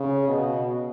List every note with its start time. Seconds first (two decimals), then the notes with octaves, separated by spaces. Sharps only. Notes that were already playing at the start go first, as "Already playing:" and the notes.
Already playing: C#3
0.28 B2